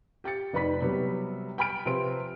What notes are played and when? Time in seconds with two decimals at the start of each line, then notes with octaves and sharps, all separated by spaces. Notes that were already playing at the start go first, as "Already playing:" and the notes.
0.24 G4 G5 A6 C#7
0.53 F1 D#4 B4 D5 B5 B6
0.81 C3 F#3 G3 B3
1.58 G5 G#5 B5 F6 D7
1.86 C3 F3 B4 C5 C6 D7